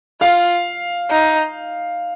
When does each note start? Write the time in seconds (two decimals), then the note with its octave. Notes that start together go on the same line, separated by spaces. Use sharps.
0.21 F4 F5
1.11 D#4